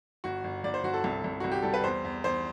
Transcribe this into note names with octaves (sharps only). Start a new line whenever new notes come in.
G1 F#4
G1
G1 D5
C5
G1 F#4
A4
C2
C2
C2 F#4
G4
G3 A4
B4
E2 C5
E2
E2 C5